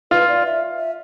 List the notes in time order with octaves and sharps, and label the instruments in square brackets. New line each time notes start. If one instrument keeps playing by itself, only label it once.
[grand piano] F4 [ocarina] B4
[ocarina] D5
E5
E5